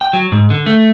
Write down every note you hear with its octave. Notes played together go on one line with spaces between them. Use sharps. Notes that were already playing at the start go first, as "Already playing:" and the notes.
G5
F#3
G#2
D3
A3